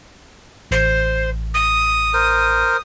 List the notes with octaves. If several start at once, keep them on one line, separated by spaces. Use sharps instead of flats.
A1 C5
D#6
A#4 C5